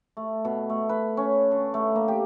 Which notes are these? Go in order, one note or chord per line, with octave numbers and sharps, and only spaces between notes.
A3
B2
A3
B4
C#4
D3
A3
A#3
G4